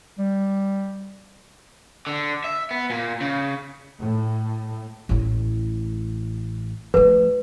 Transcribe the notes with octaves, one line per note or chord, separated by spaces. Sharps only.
G3
D3
E5
B3
A#2
C#3
A2
A1 A2
F3 A3 B4